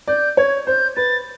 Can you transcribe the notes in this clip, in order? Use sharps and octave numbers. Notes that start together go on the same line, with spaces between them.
D5 G6
C#5 G#6
C5 G6
B4 A6